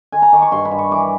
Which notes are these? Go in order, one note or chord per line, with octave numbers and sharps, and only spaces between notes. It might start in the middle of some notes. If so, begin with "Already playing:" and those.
D#3 G#5
A#5
D#3 D6
C#6
G2 C6
B5
G2
C#6
E3 D6